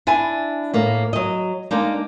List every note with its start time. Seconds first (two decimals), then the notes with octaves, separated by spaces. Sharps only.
0.07 D4 E4 G#5
0.73 A2 A#3
1.13 F#3 D#5
1.71 G#3 A#3 D4 D#4